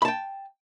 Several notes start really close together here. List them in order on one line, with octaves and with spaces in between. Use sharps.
B5 A5 G5